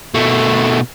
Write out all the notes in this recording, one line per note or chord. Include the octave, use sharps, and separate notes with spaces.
B2 A3